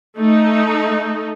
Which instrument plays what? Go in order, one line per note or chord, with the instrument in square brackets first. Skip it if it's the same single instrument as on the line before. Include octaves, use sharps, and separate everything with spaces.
[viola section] A3 D#4